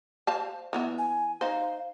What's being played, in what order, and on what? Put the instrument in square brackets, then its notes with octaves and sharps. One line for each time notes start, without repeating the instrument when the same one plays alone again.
[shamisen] C5 F5 A5
E3 B3 E5
[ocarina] G#5
[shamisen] D#4 C5 [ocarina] F5